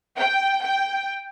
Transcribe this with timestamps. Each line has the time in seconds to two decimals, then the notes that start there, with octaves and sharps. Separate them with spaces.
0.17 G5
0.62 G5